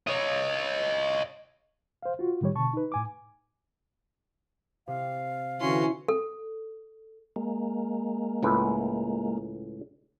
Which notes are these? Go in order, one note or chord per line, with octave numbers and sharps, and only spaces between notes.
C#5 D#5
C5 F5
F4 F#4
A2 D#3 G3 G4 C#5
B2 D3 A5 C#6
D#4 B4
A2 G#5 D6
C3 F5
D3 E3 C#4 E4 F#4 C6
A4
G#3 A#3
C#2 A2 B4